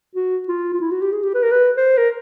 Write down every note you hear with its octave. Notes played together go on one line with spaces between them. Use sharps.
F#4
F4
F4
E4
F#4
G4
G#4
G4
B4
A#4
B4
C5
A#4